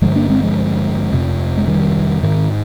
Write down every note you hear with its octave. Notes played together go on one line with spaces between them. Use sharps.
G2 D3 F3 G#3
A#3 D4
G#3 C4
F3 G#3
F2 C3
G#3
D#3 G3
G#2 D#3